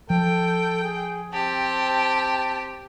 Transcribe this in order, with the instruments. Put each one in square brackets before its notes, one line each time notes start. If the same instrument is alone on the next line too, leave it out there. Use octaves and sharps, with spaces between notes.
[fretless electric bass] F3 [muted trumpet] A4 [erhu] G5
[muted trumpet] G#4
[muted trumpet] C4 [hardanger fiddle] G4 [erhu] A5